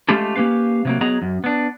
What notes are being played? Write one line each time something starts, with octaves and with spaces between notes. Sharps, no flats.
G#3 A3 C#4 F4 G4 A4
A#3 C#4 G4 B4 F5
C3 F#3 A#3
F#3 B3 G#4 D#5 A#5
F#2
B3 D4